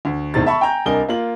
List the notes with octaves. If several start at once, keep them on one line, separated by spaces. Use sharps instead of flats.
D2
E1 A2 C3 D#3 A6
E5 A5 B5 C#6
G5 G#5 A#5 G6
C2 D4 A#4 D#5 G#5 G7
A#3 F4 F#7